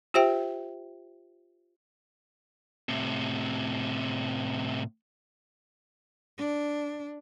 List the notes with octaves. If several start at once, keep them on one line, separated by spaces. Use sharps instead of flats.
F4 G4 C5 E5 G5
A2 C3
D4